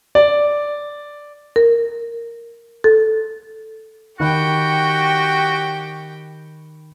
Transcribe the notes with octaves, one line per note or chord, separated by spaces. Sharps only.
D5
A#4
A4
D#3 F#4 G4 G5 B5 F#6